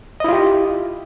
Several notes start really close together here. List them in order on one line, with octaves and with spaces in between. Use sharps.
D#5 E4 F4 G4